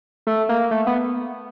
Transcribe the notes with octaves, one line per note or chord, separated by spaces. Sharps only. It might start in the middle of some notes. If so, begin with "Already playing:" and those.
A3
A#3
A3
B3